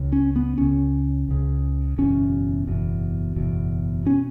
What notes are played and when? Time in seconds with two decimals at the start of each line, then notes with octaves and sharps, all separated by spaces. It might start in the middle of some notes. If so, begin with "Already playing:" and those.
Already playing: C#2 C#3
0.13 C#4
0.36 B3
0.58 C#2 C#3 C#4
1.29 C#2 C#3
1.98 F#1 E2 B2 C#4
2.67 F#1 E2 B2
3.36 F#1 E2 B2
4.06 B2 C#4